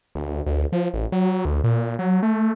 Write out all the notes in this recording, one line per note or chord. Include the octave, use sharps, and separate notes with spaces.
D2
D2
F3
A1
F#3
D2
A#2
F#3
A3